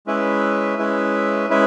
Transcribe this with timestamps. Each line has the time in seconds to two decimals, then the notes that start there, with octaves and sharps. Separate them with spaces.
0.07 G#3 C#4 E4 B4 E5
0.78 G#3 C#4 E4 B4 E5
1.49 G#3 C#4 E4 B4 E5